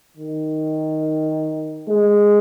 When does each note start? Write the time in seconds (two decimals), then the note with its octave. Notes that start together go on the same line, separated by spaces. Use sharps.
0.17 D#3
1.88 G#3